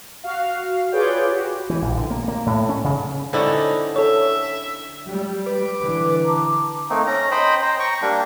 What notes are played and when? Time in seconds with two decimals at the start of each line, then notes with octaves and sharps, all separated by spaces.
0.24 F#4 F5
0.92 F4 G#4 B4 C#5 D5 G5
1.30 F#4 G4
1.70 E3
1.82 A#1
1.97 D3
2.11 A#3
2.28 A#3
2.46 A2
2.69 C#4
2.84 C#3
3.33 D3 C4 C#4 D#4 E4 D5
3.96 A4 C#5 E5
5.08 G3
5.46 B4 D6
5.80 D3 E3
6.24 A5 A#5 D6
6.90 A3 A#3 C4 D#4
7.07 C#4 A#5
7.31 C5 D#5 G5 B5
7.62 C5 G5 A#5
7.79 G5 A#5 C#6
8.02 G3 A#3 D4